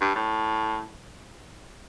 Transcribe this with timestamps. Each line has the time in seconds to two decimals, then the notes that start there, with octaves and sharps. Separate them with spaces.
0.01 G2
0.15 A2